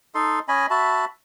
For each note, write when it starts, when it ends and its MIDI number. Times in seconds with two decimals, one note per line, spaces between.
0.15 0.40 63
0.15 0.40 69
0.15 0.40 84
0.48 0.66 61
0.48 0.66 75
0.48 0.66 80
0.48 0.66 83
0.70 1.05 66
0.70 1.05 76
0.70 1.05 81
0.70 1.05 83